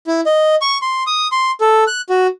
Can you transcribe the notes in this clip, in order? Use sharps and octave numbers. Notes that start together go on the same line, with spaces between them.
E4
D#5
C#6
C6
D#6
C6
A4
F#6
F#4